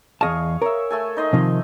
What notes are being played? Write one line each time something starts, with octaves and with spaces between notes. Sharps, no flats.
E2 G#4 D#5 F5 A5 C#6
A#4 C#5 E5
A3 A4 G#5
D#4 D#5 C6
C3 D#3 F3